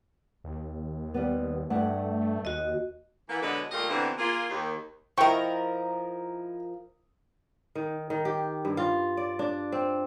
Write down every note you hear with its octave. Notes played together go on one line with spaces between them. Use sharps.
D#2
G3 B3
G2 A3 F#5
D#2 F#4 D#5
E3 A#3 B3
B2 D3 F#3 G#3 B4
D#2 A#2 G3 A3 F4 D#5
B2 D3 E3 B3 C4 D#4
A#3 F4 G#4
D#2
F3 E4 A#4 D#5 G5 C#6
D#3
D#3
G4
G2
F4
D5
D4
C4